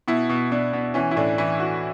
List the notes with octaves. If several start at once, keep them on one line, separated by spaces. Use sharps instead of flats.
B2 E4
B2
B2 D4
B2
E3 C#4
E4
A2 D4
E3 E4
E3 F#4